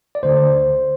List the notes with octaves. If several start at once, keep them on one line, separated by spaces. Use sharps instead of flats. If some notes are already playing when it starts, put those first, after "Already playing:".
D5
D2 D3 C5